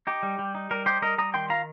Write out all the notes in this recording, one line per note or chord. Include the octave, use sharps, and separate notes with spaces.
D#4 G4
G3
G3
D#4
G3 A#4
D#4 G4 C5
G3 A#4 D#5
G3 A#5 D#6
D#3 G5 C6
F4 F5 A#5